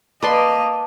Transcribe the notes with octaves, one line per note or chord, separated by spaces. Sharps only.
A#3 B4 D5 D#5 A5 C6 D6